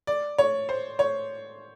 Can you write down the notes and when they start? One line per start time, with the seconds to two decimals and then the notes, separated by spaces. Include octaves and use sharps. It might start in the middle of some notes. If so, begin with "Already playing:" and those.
0.07 D5
0.38 C#5
0.69 C5
0.99 C#5